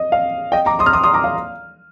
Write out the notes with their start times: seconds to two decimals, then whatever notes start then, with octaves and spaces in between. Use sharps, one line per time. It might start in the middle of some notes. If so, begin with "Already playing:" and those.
Already playing: D#5
0.12 F5
0.52 D#5 G5
0.66 A#5 D6
0.79 C6 D#6
0.86 F6
0.93 C6 D#6
1.04 C6 D#6
1.14 A#5 D6
1.24 F5